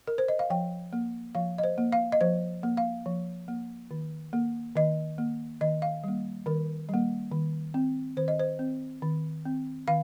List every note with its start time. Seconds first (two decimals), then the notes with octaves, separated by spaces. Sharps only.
0.07 A#4
0.18 C5
0.28 D#5
0.39 F5
0.50 F3 G5
0.93 A#3
1.35 F3 F5
1.58 D#5
1.64 C5
1.78 A#3
1.92 F5
2.12 D#5
2.21 F3 C5
2.63 A#3
2.77 F5
3.06 F3
3.48 A#3
3.91 D#3
4.33 A#3
4.76 D#3 D#5
5.18 A#3
5.61 D#3 D#5
5.82 F5
6.04 G3 A#3
6.46 D#3 A#4
6.89 G3 A#3
7.32 D#3
7.74 C4
8.17 D#3 C5
8.28 D#5
8.39 C5
8.59 C4
9.02 D#3
9.45 C4
9.88 D#3 F5